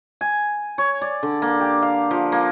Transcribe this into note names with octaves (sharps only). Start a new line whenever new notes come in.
G#5
C#5
D5
D3
A#3
G4
F5
F3
A#3